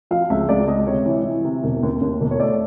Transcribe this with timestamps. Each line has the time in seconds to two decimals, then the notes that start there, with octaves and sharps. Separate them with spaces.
0.11 F3 F5
0.30 C#2 E5
0.49 C#2 D5
0.68 C#2 D#5
0.87 C3 C#5
1.06 E3
1.25 E3
1.45 C3
1.64 E1
1.83 D#2
2.01 D#2
2.21 E1
2.31 C#5
2.40 A3 D5